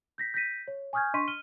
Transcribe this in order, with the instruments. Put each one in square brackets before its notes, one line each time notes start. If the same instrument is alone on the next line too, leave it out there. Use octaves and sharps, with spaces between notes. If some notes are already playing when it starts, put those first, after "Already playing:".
[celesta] G6 A#6 B6
G6 A#6 B6 D#7
C#5
G#5 C#6 D#6 F6 G6 G#6
D4 D#5 C6 C#6 B6 D#7
F6 D#7 G7